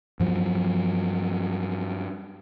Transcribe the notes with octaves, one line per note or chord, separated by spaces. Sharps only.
G2 F3 F#3